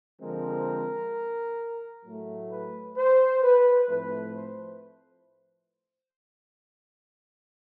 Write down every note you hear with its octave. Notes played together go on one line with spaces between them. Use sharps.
D3 F3 G#3 C4 A#4
A2 F#3 A3
B4
C5
B4
A2 F3 A3 C4 B4
C5